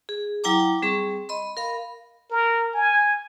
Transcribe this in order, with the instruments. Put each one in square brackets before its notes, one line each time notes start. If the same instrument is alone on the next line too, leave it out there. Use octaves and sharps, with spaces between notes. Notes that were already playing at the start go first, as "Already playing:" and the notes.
[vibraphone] G#4
F#3 E4 G5 A#5 D6
G3 C4 G#4 C#6
D#5 B5 C6
A#4 F5 B5
[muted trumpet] A#4
G#5